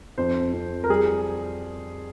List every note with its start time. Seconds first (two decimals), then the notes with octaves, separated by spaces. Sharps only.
0.18 F2 C5
0.53 F2
0.84 A#4
0.90 G3 G#4